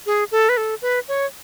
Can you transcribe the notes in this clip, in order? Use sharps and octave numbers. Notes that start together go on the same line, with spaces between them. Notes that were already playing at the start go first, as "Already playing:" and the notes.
G#4
A4
B4
A4
B4
C#5